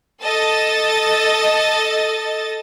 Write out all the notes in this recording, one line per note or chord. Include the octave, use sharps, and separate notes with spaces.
A4 D#5 A6